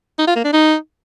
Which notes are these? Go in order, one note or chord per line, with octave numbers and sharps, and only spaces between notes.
D#4
F4
A#3
D4
D#4